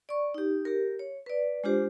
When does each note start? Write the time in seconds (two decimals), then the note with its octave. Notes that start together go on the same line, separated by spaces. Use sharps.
0.09 D5 C#6
0.34 D#4 G4
0.65 G4 A#4
0.99 C#5
1.26 B4 D5
1.64 G#3 D4 F4 G4 C5